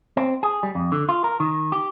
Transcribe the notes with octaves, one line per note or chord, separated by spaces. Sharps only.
C4
G#4
G3
F2
D3
F4
A#4
D#3
G4